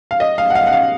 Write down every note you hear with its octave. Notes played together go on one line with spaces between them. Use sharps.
F5
D#5
F5
F#5
F5
F#5
F5